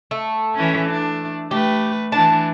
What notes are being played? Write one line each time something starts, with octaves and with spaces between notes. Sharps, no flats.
A3
E3 C#4
D4
A3 G4 B4
E3 D4 A5